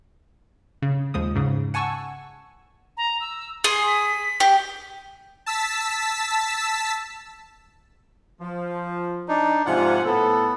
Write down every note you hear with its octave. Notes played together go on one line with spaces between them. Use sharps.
C#3
D#2 F3 G#3 D#6
G#2 C#3
F#5 G#5 A5 C#6 E6
A#5
E6
G#4 C6
B6
G4
A5 E6 B6
F3
D4 D#4
G#2 C3 F3 F4 F#5 G#5
A2 B3 A4